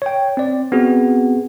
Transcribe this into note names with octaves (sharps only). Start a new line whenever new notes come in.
C#5 G5
C4 D5
B3 C4 F#4 G#4